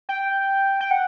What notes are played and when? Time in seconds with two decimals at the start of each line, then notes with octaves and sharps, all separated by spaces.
0.09 G5
0.80 G5
0.91 F#5